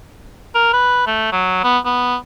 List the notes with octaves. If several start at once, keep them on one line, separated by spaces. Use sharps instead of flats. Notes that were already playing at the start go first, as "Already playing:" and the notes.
A#4
B4
A3
F#3
B3
B3